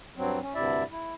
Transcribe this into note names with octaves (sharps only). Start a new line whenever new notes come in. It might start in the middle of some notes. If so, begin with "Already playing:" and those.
G2 F#3 C4
C#4
D2 G2 C3 E4 D5 E5
E4